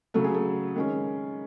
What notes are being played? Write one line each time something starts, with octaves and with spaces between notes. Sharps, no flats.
C#3 F#3 A3 A4
G#4
A4
D#3 G#3 C#4